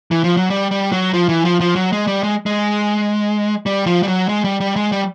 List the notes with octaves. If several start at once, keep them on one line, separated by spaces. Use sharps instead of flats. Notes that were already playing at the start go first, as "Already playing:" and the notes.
E3
F3
F#3
G3
G3
F#3
F3
E3
F3
F3
F#3
G#3
G3
G#3
G#3
G3
F3
G3
F#3
G#3
G3
G3
G#3
G3